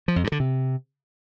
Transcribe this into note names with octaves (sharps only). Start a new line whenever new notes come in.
F3
F2
G2
D3
C3